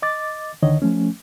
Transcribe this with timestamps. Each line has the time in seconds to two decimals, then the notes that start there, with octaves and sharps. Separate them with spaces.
0.02 D#5 D6 A6
0.63 C#2 D3 D#3 C#5 D#5
0.82 F3 A3 C#4